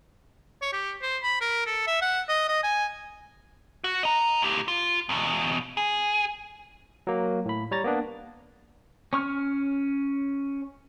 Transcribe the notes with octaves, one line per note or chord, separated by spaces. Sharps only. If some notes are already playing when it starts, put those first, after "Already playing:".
C#5
G4
C5
B5
A#4
A4
E5
F#5
D#5
D#5
G#5
F#4
D#5 A#5
A2 G4
F4
E2 B2
G#4
F#3 A#3
A2 B5
G3 C#5 A#5 A6
A#3 B3 D4
C#4 C#6 F6